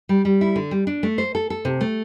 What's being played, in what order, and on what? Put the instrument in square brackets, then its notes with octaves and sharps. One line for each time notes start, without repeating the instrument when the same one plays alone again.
[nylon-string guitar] G3
G3
E4
D3
G3
D4
A3
C5
A4
A4
C3
A3